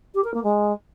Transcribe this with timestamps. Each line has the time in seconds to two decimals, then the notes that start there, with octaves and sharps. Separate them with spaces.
0.15 G4
0.24 A#4
0.34 A#3
0.44 G#3